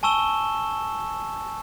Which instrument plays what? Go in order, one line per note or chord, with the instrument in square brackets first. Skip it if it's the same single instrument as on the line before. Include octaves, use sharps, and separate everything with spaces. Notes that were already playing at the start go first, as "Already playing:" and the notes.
[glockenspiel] G#5 A5 C#6 E6 E7 G7